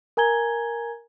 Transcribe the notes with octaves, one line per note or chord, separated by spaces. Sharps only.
A#4 G#5 A#5 G#6 G7